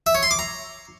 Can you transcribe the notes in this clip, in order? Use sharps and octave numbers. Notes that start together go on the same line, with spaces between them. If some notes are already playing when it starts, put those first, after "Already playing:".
E5
C#5
C6
D6
A#5